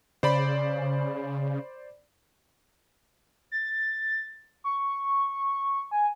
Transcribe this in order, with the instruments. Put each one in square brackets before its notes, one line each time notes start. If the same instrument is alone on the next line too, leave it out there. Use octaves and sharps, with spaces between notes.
[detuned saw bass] C#3 [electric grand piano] C5 D5 B5
[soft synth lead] A6
C#6
G#5